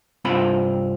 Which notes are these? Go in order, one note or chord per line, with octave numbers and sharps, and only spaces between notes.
C2 G2 C4 F4 B5